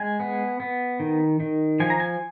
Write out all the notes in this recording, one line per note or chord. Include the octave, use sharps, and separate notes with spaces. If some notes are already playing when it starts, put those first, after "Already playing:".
Already playing: G#3 G#5
B3
B3
D#3
D#3
F3 G#5
A#5
G#5